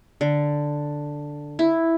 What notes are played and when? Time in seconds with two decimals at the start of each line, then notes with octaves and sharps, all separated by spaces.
0.21 D3
1.59 E4